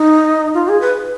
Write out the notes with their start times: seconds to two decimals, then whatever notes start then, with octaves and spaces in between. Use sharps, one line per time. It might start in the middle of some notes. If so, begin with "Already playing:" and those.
Already playing: D#4
0.54 F4
0.68 G#4
0.81 B4